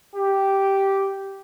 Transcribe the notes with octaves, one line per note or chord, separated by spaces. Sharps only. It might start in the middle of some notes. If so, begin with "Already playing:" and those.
G4